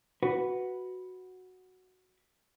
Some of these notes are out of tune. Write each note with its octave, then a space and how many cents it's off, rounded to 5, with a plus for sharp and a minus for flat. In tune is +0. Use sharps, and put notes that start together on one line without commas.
F#4 +0 B4 +0